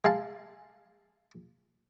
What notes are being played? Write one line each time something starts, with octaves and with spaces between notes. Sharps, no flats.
G#3 F5 A5